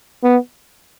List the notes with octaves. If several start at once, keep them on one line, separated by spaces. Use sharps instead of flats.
B3